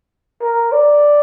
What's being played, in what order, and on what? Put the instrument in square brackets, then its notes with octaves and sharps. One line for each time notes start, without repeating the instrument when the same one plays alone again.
[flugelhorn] A#4
D5